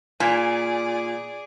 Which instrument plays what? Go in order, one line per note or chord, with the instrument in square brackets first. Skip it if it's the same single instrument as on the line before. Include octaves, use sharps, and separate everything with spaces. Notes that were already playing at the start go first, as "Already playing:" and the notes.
[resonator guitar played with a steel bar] A#2 [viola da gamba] G#4 D5 [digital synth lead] G#5